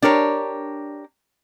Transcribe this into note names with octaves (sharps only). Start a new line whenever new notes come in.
D4 G4 A#4 C#5